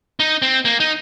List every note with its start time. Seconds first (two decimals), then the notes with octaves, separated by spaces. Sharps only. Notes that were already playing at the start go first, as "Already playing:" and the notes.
0.20 D#4
0.42 C4
0.65 A#3
0.80 D#4